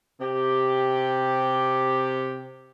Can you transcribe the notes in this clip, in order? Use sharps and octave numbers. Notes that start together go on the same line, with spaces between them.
C3 G4